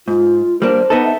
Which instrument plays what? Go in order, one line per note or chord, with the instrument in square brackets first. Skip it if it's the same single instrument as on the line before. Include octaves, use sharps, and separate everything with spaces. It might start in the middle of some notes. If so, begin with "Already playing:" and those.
[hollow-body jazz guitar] G#2 [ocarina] F4
[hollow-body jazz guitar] G3 A#3 D4 [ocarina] C5
[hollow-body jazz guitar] B3 D#4 A4
[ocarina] E5